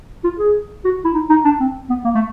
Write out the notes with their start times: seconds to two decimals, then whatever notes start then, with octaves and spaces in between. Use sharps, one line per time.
0.24 F4
0.39 G#4
0.85 F#4
1.05 E4
1.14 D#4
1.30 D#4
1.45 D4
1.60 C4
1.90 B3
2.04 A#3
2.15 A3